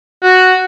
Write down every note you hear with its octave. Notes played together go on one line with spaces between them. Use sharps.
F#4